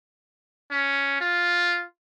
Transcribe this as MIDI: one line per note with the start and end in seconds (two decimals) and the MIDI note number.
0.71 1.20 61
1.21 1.84 65